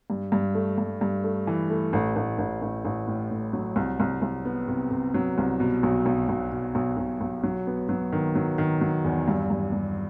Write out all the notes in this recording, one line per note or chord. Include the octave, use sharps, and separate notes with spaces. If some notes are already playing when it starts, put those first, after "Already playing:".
G2
G2
A3
G2
G2
A3
E3
A3
A1
A1
A1
A1
A1
A2
A2
F#3
C2
C2
C2
B3
C3
C3
F#3
C2
B2
B1
B1
B1
B2
B1
B1
B1
F#3
B3
F#3
D#3
F#3
D#3
F#3
E2
G2
G2
G2